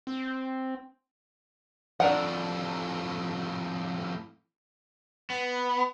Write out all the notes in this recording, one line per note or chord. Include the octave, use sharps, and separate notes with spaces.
C4
F2 A2 D4 A#4 F#5
B3